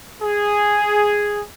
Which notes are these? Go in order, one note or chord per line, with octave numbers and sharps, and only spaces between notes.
G#4